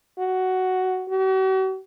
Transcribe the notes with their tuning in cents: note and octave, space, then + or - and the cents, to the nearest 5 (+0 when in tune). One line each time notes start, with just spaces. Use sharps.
F#4 +10
F#4 +45